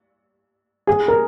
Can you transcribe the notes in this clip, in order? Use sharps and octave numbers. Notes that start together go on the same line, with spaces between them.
G#4
A#4